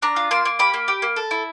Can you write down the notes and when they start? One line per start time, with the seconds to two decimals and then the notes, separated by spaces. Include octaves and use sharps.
0.02 D4 A#5
0.16 F4
0.31 A#3 C6
0.45 A#3
0.59 G4 B5
0.74 A#3
0.88 G4
1.02 A#3
1.16 A4
1.31 E4